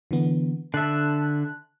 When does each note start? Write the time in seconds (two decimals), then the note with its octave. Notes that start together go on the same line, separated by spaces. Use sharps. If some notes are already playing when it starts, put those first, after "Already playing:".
0.11 D3 E3 B3
0.74 D3 E5 A5 F#6